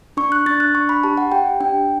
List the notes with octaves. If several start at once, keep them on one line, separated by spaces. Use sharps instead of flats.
D4 C#6
F#6
D4 A6
F#6
D4 C#6
B5
G4 A5
F#5
G4 G5
D4 G5